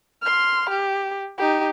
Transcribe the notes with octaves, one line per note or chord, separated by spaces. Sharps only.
C6 F6
G4
D#4 G4